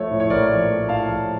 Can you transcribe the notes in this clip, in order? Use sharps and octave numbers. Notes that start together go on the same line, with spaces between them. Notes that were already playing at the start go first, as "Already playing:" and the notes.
Already playing: F3 A3 C#5
A2
C#5
A#1 A#4 D5
F3
A3
A2 F5 A5
A#1